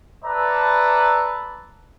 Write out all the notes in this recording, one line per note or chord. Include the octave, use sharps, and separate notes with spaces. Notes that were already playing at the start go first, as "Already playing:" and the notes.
A4 B4 D5 E5 A5 A#5